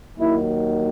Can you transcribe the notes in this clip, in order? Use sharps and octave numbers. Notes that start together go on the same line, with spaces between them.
D#2 D#3 F#3 E4